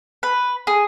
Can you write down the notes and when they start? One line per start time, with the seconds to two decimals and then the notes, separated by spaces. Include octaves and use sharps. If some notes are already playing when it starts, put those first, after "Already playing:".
0.23 B4
0.67 G#4